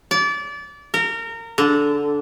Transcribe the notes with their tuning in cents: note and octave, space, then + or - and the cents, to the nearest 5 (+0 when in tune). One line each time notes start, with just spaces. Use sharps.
D5 -25
A#4 -25
D3 -15